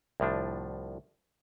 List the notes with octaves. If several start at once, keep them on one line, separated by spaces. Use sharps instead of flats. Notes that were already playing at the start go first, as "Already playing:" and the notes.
C2 A2 F3 D4